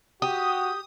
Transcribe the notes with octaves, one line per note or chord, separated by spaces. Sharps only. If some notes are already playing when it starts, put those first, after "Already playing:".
F#4 G4 D#6